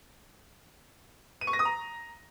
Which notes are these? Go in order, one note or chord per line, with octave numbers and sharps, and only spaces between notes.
D#7
C#6
A#6
D#6
A#5